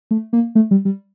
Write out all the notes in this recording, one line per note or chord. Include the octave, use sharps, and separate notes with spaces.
A3
A#3
A3
G3
G3